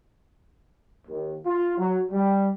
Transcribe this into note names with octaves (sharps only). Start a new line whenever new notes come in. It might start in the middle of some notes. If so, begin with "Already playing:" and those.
D#2
F4
F#3
G3